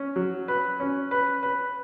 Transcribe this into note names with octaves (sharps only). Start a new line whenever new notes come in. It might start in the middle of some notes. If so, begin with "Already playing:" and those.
Already playing: C#4
F#3
B4
C#4
B4
B4